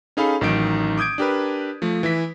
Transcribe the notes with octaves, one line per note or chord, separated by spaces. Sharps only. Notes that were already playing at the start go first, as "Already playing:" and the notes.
C#4 D#4 G#4 A4 F5 B5
A1 D#3 F#3 D#4 D7
D6 D#6 G6 G#6 D7
D4 G4 A#4 B4
F3 A3
E3 E4 B6